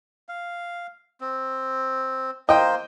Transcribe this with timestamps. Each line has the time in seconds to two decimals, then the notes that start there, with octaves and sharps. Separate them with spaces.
0.29 F5
1.21 C4
2.49 A#3 C5 D#5 G5